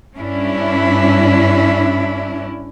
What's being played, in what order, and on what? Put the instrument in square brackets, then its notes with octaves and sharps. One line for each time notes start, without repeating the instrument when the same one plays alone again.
[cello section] G2 C#4 D4 E4